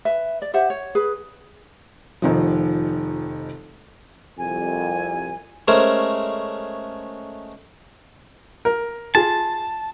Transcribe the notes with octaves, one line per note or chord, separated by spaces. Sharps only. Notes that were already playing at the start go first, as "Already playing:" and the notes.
B4 E5
D5
G4 C5 E5 F#5
C#5
G#4 B4
F1 D#3 F3
C2 F2 G#5
G#3 A3 C#4 A#4 C5
A#4
F4 G#4 A5